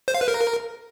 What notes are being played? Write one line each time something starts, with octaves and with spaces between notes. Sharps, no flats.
C5
F5
B4
A#4